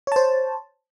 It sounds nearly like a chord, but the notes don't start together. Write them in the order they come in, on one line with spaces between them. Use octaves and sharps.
C#5 A5 C5